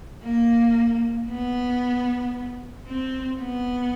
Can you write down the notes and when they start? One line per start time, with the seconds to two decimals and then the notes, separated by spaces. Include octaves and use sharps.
0.24 A#3
1.30 B3
2.87 C4
3.40 B3